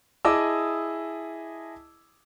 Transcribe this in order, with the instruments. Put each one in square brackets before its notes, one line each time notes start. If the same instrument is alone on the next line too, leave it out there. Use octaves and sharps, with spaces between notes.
[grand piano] E4 G#4 D#5 A5 D6 E6